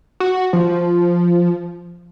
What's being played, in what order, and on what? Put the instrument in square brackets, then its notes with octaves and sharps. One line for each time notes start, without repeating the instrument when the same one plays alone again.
[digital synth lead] F#4
F3